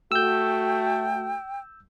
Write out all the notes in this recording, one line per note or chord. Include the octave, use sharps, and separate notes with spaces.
A3 F#4 G5 E6 G6